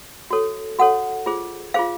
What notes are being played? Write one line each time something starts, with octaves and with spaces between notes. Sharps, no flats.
F#4 A4 C#5
F#4 A4 C#5 F#5
F4 G#4 C5
F4 G#4 C5 F5